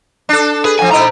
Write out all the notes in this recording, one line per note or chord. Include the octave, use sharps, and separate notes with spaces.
D4 A4
G#4 B4
A2 F3 G#5
G#2 E4 C5 D#5 A#5